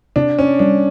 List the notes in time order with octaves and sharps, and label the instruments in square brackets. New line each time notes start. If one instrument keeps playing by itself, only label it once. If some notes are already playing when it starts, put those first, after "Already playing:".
[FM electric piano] C3 [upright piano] D4
[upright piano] C#4
[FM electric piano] G3 [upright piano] D4